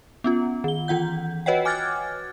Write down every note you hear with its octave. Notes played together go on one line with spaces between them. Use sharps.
B3 C#4 F4
D#3 G7
E3 F4 F#5 G6
F#4 B4 C#5 D#5 F#5 G5
G#5 D6 F6 F#6 G#6 A6